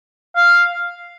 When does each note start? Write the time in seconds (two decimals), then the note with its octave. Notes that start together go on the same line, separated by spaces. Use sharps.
0.36 F5